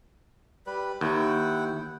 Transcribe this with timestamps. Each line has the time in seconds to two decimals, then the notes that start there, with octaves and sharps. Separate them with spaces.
0.66 G3 B4
1.01 D#2 E4 F#5 G5